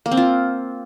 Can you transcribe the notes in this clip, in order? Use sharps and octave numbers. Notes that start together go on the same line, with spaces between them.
A#3
C4
F4